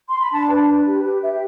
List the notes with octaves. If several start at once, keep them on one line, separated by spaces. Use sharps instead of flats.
C6
B5
D4 A5
B4
B4
G4
G4
G4 E5